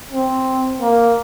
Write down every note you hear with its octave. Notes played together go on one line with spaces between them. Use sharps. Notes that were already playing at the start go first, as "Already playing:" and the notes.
C4
A#3